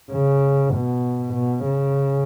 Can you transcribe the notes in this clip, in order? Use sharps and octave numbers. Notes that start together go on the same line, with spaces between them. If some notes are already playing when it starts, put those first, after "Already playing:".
C#3
B2
B2
C#3